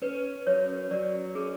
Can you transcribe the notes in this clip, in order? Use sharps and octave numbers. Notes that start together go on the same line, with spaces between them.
C#4 B4
F#3 C#5
F#3 D5
C#4 G#4